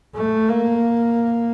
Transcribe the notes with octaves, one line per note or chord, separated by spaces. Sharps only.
A3
A#3